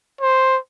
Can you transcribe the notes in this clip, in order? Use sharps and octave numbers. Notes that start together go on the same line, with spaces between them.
C5